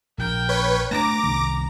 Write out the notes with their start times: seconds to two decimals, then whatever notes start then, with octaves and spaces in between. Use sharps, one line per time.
0.18 A#1 A#4 G5
0.49 B4 C#5
0.91 A3 C4 D4 A#5 D6 A#6
1.23 C2 D#3